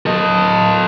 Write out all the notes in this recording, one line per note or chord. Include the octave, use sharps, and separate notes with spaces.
A4 D#5